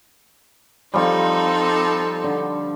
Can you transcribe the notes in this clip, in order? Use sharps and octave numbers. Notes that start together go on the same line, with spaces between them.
F3 G3 C4 D#4 A4
D3